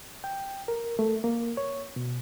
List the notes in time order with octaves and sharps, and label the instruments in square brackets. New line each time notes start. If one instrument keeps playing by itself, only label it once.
[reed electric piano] G5
A#4
A3
A#3
C#5
B2